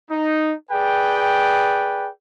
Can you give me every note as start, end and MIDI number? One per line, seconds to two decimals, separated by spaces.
0.10 0.53 63
0.71 2.09 68
0.71 2.09 71
0.71 2.09 74
0.71 2.09 79